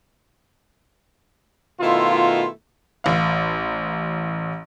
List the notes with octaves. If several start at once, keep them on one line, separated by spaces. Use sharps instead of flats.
B2 D#3 A3 E4 F4
A1 F5